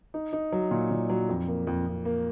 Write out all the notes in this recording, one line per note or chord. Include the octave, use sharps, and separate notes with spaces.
D#4
D#4
F#3
A#2
A#2
F#3
F2
A#3
F2
F2
A#3